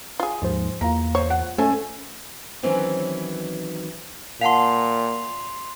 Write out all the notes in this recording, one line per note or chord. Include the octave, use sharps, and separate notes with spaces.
F4 G#4
D#2 G#2 F3 C5
E2 A#3 F4 A#5
C5 C#5
F#5
A3 C#4 A4 G#5
D#3 E3 F#3 C4 C#4
A#2 F5 F#5 A5 C6 C7 F7